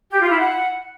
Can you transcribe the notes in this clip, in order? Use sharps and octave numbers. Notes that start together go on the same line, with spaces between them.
G4
F4
E4
F#5